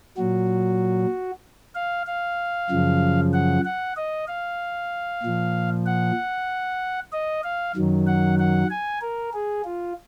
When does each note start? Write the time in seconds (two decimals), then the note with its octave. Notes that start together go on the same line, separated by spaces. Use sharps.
0.18 A#2 F#3 F#4
1.75 F5
2.07 F5
2.70 F#2 C#3 F3
3.33 F#5
3.65 F#5
3.97 D#5
4.28 F5
5.23 A#2 F3
5.86 F#5
7.12 D#5
7.44 F5
7.76 F#2 D#3 F#3
8.07 F#5
8.39 F#5
8.70 G#5
9.02 A#4
9.33 G#4
9.65 F4